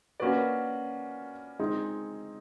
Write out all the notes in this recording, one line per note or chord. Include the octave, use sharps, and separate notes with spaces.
A#3 C#4 F#4 B4 D5
G#3 C4 D#4 G#4